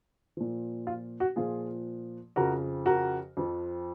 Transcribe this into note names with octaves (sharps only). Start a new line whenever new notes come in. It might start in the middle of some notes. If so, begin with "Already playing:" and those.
A#2 F3
F4
F#4
A#2 F3 F4 G#4
F2 C#3 F3 F#4 A#4
F#4 A#4
F2 F3